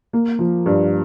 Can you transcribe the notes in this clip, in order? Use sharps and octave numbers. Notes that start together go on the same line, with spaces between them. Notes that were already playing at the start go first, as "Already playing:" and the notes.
A#3
F3
G2